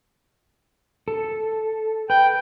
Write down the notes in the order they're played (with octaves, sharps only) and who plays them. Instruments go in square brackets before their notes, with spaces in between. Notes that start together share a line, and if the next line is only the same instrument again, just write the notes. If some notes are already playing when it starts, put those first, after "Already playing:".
[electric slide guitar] A4
[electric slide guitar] B4 [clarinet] G5